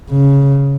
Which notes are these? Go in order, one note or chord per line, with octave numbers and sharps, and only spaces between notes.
C#3